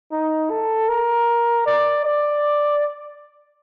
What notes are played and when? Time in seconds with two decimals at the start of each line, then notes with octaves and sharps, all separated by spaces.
0.12 D#4
0.50 A4
0.89 A#4
1.67 D5
2.05 D5